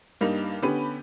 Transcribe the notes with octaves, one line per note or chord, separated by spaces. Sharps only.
G2 G3 A#3 D#4 F7
D3 B3 C#4 G4 B5 D#7